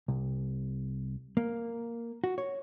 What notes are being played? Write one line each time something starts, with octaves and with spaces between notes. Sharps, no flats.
C2
A#3
F#4
C#5